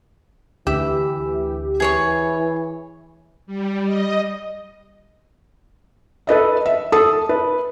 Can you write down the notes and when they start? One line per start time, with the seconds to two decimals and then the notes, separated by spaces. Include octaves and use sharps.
0.67 D2 E3 G4 E5
1.80 E3 G#4 C#5 C#6
3.46 G3
3.85 D#5
6.27 A4 B4 D#5 E5
6.66 E5
6.92 A4 A5 D#6
7.29 B4